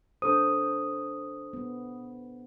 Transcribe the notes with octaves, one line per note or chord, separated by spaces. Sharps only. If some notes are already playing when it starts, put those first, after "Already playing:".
D4 A4 C5 D#6
B3